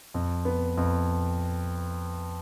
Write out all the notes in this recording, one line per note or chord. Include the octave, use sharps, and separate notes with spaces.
F2
B3
F2